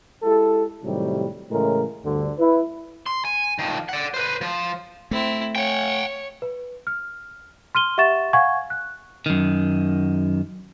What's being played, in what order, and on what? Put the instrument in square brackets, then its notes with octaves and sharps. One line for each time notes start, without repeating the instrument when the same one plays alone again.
[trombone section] G#3 E4 G4 A4
A2 C3 D#3 F#3 G3
A2 C#3 E3 G#3 A3 A#4
D2 G2 D3
E4 B4
[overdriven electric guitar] C6
G#5
D#3 F3
D5 F#5
B4 C5
F3 F4
[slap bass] A3 [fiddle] C4 E4
[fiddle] C#5 [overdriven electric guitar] F#5 G5
[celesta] B4
F6
C6 F6 D#7 G7
G4 E5 F#5 C#6 A6 E7
F5 F#5 G#5 C#6 G#6
F#6
[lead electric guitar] F#2 D#3